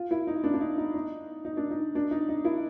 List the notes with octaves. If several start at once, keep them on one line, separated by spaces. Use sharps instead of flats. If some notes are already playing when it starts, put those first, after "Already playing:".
Already playing: F4
E4
D#4
D4
D4
D#4
D#4
D#4
D#4
D4
D#4
D4
D#4
D#4
E4